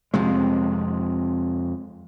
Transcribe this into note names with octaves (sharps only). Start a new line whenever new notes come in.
F2 C3 G#3